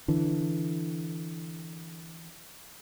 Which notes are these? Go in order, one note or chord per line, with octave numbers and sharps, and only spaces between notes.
D3 E3